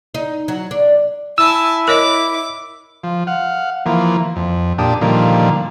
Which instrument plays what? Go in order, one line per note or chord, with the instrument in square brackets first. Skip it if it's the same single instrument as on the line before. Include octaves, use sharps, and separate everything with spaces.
[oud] D#4
F#3
D4
[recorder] E4 [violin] G#5 A5 [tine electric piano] E6
[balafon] A#4 C#5 D#5 [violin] D6
[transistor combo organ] F3
F5 F#5
E3 F3 A#3
F2
A#2 D4 G4 A5 D#6
A#2 D3 D#3 F3 G3 A#3